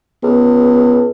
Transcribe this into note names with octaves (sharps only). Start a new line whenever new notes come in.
C#2 B3